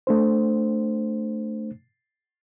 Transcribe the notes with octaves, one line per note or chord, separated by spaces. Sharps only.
A3 D4 C5